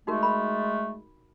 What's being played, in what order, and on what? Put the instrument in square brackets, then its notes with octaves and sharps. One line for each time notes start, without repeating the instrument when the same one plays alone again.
[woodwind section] G#3 A3 [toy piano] D#4 F#4 A#4
[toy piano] A#4 B5